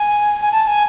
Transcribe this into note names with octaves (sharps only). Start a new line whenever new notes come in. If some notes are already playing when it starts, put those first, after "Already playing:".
Already playing: G#5
G#5
A5
G#5